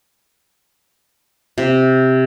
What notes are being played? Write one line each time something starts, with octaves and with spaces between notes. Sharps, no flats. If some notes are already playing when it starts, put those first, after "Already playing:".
C3